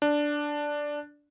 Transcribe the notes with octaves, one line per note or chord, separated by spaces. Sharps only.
D4